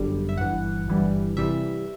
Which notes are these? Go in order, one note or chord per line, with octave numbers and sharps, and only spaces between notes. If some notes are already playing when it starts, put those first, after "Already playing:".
Already playing: G1 F#2 D3 G3
E5
G1 G2 E3 F#5
G1 G2 E3 G3
C3 E3 G3 E5